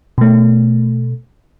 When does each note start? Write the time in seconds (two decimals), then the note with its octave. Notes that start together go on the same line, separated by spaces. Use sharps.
0.18 B2 A3